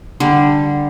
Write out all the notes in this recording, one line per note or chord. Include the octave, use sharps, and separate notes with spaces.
D3 G3